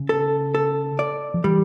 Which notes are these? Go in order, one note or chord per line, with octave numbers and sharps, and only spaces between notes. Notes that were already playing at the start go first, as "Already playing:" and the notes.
Already playing: C#3
A4
A4
D5
F3
E3 G3